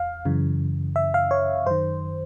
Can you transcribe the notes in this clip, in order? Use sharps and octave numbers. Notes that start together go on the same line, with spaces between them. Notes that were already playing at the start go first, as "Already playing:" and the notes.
Already playing: E2 F5
F#2 C#3 E3
E5
F5
C#5
F#2 D#3 C5